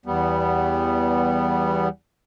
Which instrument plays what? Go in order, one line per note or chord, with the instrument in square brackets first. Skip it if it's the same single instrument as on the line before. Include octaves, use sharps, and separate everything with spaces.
[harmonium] E2 G3 B3